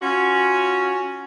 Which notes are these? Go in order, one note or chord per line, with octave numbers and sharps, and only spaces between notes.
C#4 F4 F#4